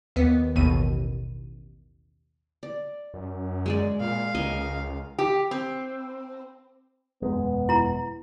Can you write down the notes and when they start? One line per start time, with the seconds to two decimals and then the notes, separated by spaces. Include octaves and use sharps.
0.16 D#2 B3
0.56 A1 D#2 B2 D#7
2.63 D5
3.14 F#2
3.66 G#3 G#4 D5
4.00 A#2 F5
4.35 C#2 A#4 D#5 G#5
5.18 G4
5.51 C4
7.22 E1 F#2 G#3 B3
7.69 E4 A#5